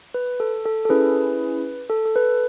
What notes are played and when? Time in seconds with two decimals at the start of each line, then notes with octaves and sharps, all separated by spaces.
0.14 B4
0.40 A4
0.65 A4
0.85 A4
0.89 C#4 E4 G#4 B4
1.90 A4
2.05 A4
2.16 B4